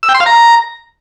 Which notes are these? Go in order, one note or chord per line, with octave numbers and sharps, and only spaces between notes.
E6
G5
C6
F5
A#5